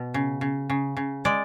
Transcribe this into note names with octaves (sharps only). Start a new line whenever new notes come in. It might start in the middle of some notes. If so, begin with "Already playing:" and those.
Already playing: B2
C#3
C#3
C#3
C#3
G#3 D5